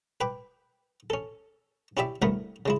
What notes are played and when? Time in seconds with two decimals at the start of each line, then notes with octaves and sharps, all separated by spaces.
0.21 B4 G5 D6
1.10 C#4 A4
1.97 C#4 E4 G4 D5 E5
2.22 C2 D3 A3 B3 A#4 B5
2.66 C#3 G#3 E4